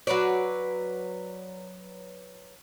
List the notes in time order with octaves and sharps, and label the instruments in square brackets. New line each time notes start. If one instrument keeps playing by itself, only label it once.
[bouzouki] F#3 B4 C#5 D5